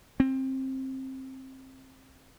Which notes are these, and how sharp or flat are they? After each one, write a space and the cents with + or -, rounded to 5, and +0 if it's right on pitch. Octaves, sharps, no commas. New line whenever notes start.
C4 +20